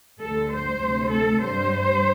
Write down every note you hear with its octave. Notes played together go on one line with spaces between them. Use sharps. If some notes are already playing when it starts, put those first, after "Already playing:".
D2 D3 G3 A4
C5
D2 C3 A3
A4
G2 G3 C5